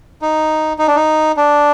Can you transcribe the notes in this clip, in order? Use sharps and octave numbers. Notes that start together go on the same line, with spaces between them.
D#4
D#4
D4
D#4
D4